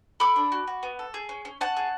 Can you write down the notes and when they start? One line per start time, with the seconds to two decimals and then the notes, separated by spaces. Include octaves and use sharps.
0.20 A4 B5 D6
0.36 D4
0.52 F#4
0.67 F#4
0.83 B3
0.99 A4
1.14 G#4
1.29 C#4
1.45 C#4
1.61 C#4 F#5 A5
1.77 G#4